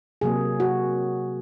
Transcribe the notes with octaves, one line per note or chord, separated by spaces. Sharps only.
C3 F#3 A#3 G#4
F#4